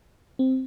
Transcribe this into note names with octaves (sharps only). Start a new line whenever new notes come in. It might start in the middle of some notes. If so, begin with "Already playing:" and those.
C4